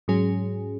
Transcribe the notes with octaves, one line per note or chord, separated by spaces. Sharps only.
G#2 F#3 C#4 G#4